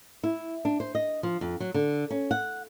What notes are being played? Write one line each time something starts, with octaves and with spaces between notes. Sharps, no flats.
E4
D4
C5
D#5
F3
F2
F#3
D3
C#4
F#5